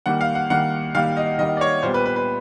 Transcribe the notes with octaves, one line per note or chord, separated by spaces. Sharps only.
D#3 G3 A#3 F#5
F5
F#5
D#3 G3 A#3 F#5
D#3 G3 A#3 F5
D#5
D#3 G3 A#3 D#5
D5
C#5
A#2 G3 B3 C5
B4
B4
B4